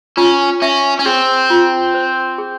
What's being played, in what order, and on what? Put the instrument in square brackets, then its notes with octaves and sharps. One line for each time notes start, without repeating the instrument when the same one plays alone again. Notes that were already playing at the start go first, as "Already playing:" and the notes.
[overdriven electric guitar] C#4 [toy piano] F4
[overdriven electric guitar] C#4 [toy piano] E5
[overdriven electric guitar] C#4
[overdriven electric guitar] C4 [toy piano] G#4
[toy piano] F4
C5
G#4